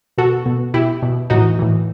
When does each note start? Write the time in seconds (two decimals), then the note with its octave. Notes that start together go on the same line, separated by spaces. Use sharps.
0.18 B2 F#4 A4
0.46 B2
0.74 B2 E4 G4
1.02 B2
1.30 A2 E3 D#4 F#4
1.59 A2 E3